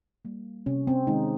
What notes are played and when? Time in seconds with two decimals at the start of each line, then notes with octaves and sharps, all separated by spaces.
0.25 G3 A#3
0.66 C3 C#4
0.87 C4
1.07 D#3 G#3 D#4